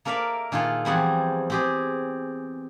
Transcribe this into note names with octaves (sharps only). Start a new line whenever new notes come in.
A#3 A4 A#4 D5 E5 F5
A#2 D#3 F4 G#4 A4
E2 F3 G3 C4 G#4 F#5
C4 G4 G#4